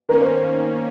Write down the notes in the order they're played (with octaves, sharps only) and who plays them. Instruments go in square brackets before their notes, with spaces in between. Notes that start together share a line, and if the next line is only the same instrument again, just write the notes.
[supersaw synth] D#3 A#3 C#4 [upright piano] A#4
[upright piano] C5